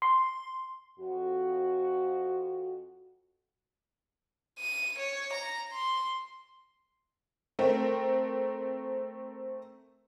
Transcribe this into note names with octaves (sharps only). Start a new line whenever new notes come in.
C6
F2 F#4
D#7
C#5
A#5
C6
A3 C4 A#4